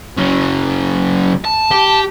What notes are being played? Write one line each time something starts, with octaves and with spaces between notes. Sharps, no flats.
C#3 F#3
A5
G4